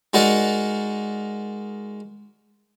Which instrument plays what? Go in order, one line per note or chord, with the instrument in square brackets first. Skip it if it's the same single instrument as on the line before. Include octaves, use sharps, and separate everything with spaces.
[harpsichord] G#3 D#4 F#4 A#4 D5 F#5